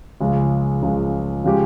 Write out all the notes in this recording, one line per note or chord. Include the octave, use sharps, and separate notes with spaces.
C#2 C#3 F3 G#3
C#2 C#3 F3 G#3
C#3 F3 G#3 C#4 G4